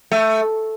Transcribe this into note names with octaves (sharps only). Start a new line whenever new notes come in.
A3